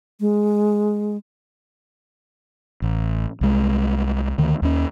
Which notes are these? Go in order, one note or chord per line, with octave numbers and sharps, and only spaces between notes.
G#3
A1
C2 G#3
D2 D#3
D#2 C#4